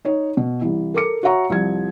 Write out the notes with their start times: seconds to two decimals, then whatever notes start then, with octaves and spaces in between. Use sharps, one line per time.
0.05 D#4 C#5
0.37 B2
0.62 C2 E3
0.94 A4 A#4 D6 C#7
1.23 F#4 C#5 E5 F#5 A#5 C#6
1.50 C2 F3 G#6